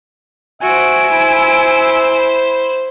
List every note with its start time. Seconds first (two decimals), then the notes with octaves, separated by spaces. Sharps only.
0.62 F#4 C5 E5 G#5 D7
1.10 E4 C5